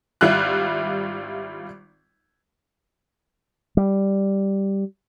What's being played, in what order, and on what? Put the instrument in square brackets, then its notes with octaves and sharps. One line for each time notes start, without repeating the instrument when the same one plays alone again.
[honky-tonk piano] G#1 G3 E4 F4 F#6
[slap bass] G3